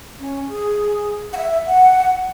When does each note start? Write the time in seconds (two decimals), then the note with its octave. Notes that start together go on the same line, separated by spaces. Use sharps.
0.19 C#4
0.49 G#4
1.33 F#5
1.37 E5
1.66 F#5